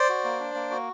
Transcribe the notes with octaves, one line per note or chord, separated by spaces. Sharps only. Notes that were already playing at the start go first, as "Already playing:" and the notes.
Already playing: C5 D5
F#4
A#3
D4
A#3
F#4